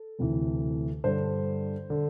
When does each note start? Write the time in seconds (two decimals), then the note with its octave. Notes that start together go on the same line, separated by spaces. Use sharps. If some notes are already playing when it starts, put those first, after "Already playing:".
Already playing: A4
0.19 D2 C3 E3
1.04 G2 D3 C5
1.90 D3